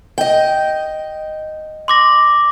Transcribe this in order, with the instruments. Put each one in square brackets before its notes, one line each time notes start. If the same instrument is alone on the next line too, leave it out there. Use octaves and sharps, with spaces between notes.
[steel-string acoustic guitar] D#5 G5
[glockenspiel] C6 D6 A#6